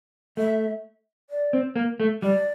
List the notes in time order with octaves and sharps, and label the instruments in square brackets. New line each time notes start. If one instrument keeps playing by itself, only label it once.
[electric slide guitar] A3 [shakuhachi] E5
[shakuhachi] D5
[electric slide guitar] C4
A#3
A3
[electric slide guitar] G3 [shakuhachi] D5